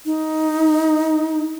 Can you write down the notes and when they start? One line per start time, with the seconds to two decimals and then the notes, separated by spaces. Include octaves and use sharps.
0.06 D#4